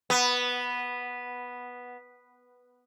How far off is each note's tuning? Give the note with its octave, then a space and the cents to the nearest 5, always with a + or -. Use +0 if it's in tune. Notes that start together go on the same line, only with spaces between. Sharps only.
B3 -5